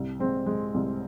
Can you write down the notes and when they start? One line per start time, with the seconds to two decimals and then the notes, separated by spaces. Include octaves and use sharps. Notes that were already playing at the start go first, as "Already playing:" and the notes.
Already playing: C2
0.19 G#3 C4
0.46 G#3
0.74 C2